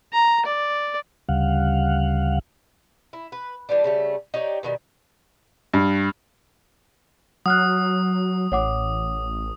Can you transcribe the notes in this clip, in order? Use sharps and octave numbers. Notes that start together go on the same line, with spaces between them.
A#5
D5
D2 C#3 G3 F5 F#5
E4
B4
E3 G3 B3 D4
C#3 G3 A3
D#4 G4 C#5 D5
B2 D#3 F#3 G3
G2
F#3 F#5 D#6 F6 F#6
A1 C#5 F#5 D6